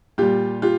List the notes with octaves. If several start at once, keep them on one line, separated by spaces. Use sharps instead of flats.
A#2 G3 F4 G4
F4 G4